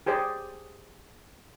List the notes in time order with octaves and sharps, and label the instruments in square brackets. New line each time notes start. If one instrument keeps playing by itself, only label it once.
[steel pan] G4 G#4 C5 D5